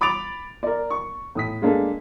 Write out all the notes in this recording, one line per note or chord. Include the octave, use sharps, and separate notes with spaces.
B5 D6 A6 D7 F7
A#4 D5
C#6
A2 D#6 B6
G#3 A#3 D4 G#4 A4